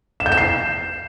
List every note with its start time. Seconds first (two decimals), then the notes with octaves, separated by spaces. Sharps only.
0.20 E7
0.26 G6
0.32 E7
0.37 C7